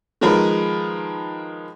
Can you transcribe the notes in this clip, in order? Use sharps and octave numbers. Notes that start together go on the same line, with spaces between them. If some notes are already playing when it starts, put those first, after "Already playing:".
D#3 F3 G#3 A#4 B4